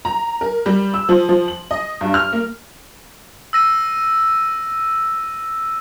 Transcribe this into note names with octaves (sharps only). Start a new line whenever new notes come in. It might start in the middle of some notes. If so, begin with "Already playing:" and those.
A#5
A#4
G3
E6
F3
F3
F#7
D#5
G2
F6
A#3
E6 A#6 D#7